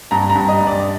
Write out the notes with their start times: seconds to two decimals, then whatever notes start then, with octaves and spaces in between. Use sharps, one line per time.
0.11 G2 A#5
0.30 A#5
0.35 G2
0.48 D#5
0.60 G2
0.67 D5